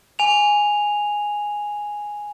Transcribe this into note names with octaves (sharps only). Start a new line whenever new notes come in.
G#5 F7